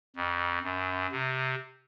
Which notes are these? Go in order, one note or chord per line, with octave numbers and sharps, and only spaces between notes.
F2
F#2
C3